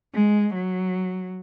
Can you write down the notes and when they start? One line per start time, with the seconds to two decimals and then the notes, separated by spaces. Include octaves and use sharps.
0.14 G#3
0.54 F#3